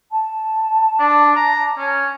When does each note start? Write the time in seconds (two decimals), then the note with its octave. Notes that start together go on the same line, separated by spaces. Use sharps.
0.12 A5
0.99 D4
1.36 A#5
1.78 C#4